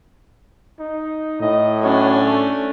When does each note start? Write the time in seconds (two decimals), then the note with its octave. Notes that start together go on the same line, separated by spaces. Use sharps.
0.80 D#4
1.41 A2 D#5
1.83 F#3 C#4 D4
2.24 A3